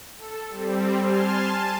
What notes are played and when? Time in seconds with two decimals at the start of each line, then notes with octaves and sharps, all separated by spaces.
0.17 A4
0.50 G3 C4
1.00 G#5 A5 C6 F6
1.44 A5 D#7